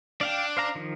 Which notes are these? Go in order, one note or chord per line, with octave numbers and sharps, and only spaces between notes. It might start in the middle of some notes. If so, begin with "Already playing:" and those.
D4 D5 F5 G5
C5 F5 A#5
D#3 F3